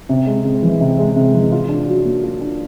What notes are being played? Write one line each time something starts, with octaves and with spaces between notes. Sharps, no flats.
C3
G#3
C3
E3
C3
G#3
C3
E3
F4
D4
F#3
A#3
F4
D4